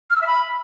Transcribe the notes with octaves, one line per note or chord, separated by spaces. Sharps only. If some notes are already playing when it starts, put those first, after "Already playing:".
F6
E6
E5
B5